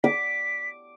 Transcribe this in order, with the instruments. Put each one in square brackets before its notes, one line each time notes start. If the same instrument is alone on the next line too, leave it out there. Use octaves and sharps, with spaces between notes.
[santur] D6 [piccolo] B6